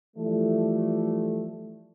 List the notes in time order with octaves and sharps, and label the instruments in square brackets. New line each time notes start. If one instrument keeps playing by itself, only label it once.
[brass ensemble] E3 F3 G3 A3